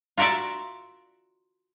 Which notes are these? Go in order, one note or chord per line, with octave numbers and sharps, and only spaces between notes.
F4 F#4 A#4 D5 E5